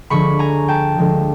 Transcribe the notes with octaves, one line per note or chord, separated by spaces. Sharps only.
D2 D3 F3 G#3 B5 C#6
G#5 A#5
G5 A5
D2 D3 F3 G#3